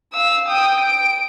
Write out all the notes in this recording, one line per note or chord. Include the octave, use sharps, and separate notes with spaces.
F5 E6
G5 D#6
D7